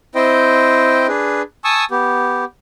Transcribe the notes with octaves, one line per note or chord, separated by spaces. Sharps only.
C4 E4 C5 D#5 G5
D4 G#4 B4
G#5 A5 C#6 D#6 E6
B3 G4